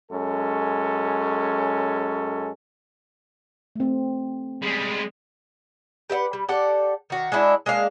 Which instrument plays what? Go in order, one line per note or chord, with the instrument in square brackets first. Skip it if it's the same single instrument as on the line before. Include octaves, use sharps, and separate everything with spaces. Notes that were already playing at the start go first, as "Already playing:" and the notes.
[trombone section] F#2 G#3 C#4 A4
[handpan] A3 C4
[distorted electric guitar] G3 G#3
[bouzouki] G4 B4 E5 F#5
G3
G4 A4 D5 F#5
D#3 F#4
G#3 D4 E4 F#4
G#3 A#3 D4 F5